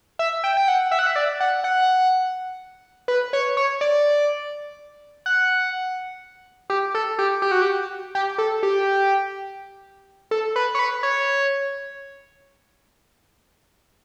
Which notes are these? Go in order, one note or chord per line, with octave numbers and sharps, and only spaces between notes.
E5
G5
G5
F#5
E5
F#5
E5
D5
F#5
F#5
B4
C#5
C#5
D5
F#5
G4
A4
G4
G4
F#4
G4
G4
A4
G4
A4
B4
C#5
B4
C#5